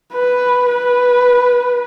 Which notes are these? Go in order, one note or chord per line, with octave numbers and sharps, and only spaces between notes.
B4
B4